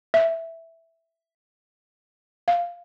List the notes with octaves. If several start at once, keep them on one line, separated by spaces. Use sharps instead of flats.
E5
F5